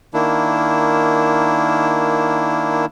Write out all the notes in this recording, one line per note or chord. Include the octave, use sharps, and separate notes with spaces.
D#3 A#3 D4 E4